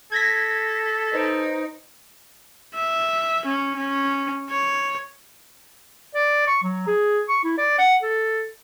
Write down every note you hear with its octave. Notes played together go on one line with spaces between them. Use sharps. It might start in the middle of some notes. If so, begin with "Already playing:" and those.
A4 G#6 A#6 B6
D#4 B4 C5 D7
E5
C#4
C#4
C#5
D5
C#6
F#3
G#4
C#6
E4
D5
F#5
A4